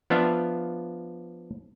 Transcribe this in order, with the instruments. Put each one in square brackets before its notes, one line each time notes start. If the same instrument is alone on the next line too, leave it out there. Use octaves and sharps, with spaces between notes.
[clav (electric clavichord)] F3 B3 D4 F4 E5 F5